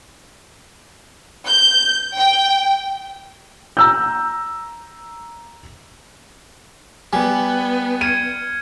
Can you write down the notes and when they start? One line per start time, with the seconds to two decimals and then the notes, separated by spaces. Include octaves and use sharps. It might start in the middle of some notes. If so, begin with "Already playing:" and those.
1.47 G6
2.17 G5
3.77 A#5 E6 G6
7.13 G3 B3 G#5
8.01 F6 G#6 C#7 D#7